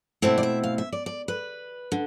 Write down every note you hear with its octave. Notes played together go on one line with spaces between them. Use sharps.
B2 A3 C4 E4 E5
D5
E5
F5
E5
D5
D5
B4
D3